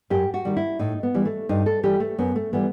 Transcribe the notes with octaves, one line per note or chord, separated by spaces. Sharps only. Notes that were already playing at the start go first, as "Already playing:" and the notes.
F#2 G4
F#4
D#3 G3
E4
A2 D#4
B3
E3 G3
A3
G2 D#4
A4
E3 G3 G4
A3
F#2 B3
A3
E3 G3 B3